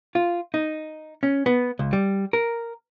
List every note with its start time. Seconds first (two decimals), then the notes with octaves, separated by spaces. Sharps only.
0.15 F4
0.54 D#4
1.23 C#4
1.46 B3
1.79 C#2
1.93 G3
2.33 A#4